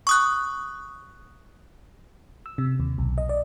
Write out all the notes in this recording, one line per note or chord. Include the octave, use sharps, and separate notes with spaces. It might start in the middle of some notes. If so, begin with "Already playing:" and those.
C#6 D#6 F#6
E6
C3
D#2
B1
D#5
D5